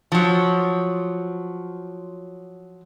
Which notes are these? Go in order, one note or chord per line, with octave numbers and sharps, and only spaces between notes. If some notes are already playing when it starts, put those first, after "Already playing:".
F3 F#3